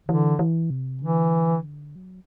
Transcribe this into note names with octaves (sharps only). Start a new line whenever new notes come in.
D3 E3
E3
C3
D3 E3
F#3